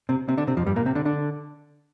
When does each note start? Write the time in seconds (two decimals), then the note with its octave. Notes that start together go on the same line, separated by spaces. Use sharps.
0.09 C3 C4
0.28 C3 C4
0.37 D3 D4
0.47 C3 C4
0.57 F2 F3
0.67 G2 G3
0.76 A#2 A#3
0.86 C3 C4
0.95 D3 D4
1.05 D3 D4